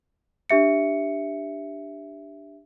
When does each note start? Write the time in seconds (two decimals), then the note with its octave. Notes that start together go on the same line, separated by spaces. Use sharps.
0.50 D4 G4 E5 C#7